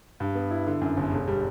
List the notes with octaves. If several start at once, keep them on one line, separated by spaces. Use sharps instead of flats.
G2
B3
E4
D3
F#2
G1
E1
G3